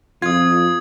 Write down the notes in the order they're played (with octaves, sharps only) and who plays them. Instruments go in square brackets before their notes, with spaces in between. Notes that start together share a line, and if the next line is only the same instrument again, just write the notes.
[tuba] F2 [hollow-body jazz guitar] F4 [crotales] D#6 G#6